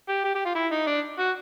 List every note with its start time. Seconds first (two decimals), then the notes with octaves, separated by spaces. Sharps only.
0.09 G4
0.24 G4
0.35 G4
0.46 F4
0.55 E4
0.72 D#4
0.87 D4
1.19 F#4